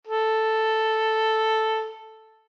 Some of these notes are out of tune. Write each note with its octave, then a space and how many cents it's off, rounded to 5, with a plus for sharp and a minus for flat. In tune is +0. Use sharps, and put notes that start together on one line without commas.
A4 +0